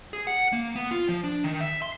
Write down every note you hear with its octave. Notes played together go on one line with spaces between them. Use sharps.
G#4
F#5
A#3
B3
F4
F3
D4
D#3
E5
C6